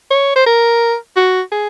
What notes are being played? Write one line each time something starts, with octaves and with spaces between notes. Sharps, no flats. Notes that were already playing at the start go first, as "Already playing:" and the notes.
C#5
C5
A#4
F#4
G#4